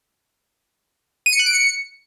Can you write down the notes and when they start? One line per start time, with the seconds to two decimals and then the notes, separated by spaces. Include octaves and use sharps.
1.26 D#7
1.33 C#7
1.39 F#6
1.46 D7
1.53 C#7